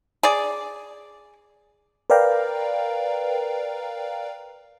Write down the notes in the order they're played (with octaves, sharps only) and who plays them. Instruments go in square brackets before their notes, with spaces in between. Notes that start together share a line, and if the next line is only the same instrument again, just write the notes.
[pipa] G#4 D5
[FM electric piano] A#4 B4 D5 F5 G5 A#5